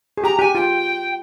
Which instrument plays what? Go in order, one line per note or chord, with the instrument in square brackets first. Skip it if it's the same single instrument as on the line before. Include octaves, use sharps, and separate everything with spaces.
[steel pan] G#4
[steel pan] G4 [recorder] A#5
[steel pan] G4 [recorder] G#5
[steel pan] F4 [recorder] G5